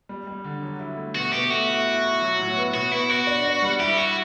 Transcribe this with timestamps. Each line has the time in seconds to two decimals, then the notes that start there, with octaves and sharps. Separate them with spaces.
0.09 G3
0.27 G3
0.44 D3
0.62 F#3
0.80 E4
0.97 A3
1.15 B2 F#4
1.33 B2 G4
1.50 A3 F#4
1.69 E4
1.86 E4
2.04 E4
2.22 F#3
2.39 A2
2.57 B3
2.74 B2 F#4
2.92 B3 E4
3.09 B3 F#4
3.27 D4
3.45 D4
3.62 G3
3.80 E4 G4
3.97 E4 F#4